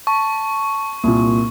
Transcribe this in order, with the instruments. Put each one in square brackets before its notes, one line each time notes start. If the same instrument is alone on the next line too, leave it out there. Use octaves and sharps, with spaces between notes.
[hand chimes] A5 [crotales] C#6
[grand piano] C2 A#2 [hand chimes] A#3